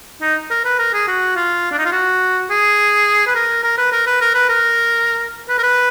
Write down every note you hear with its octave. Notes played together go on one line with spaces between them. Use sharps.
D#4
A#4
B4
A#4
G#4
F#4
F4
D4
D#4
F4
F#4
G#4
B4
A#4
A#4
B4
A#4
B4
A#4
B4
A#4
B4
A#4
B4